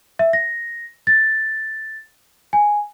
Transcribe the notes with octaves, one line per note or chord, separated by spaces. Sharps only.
E5
A#6
A6
G#5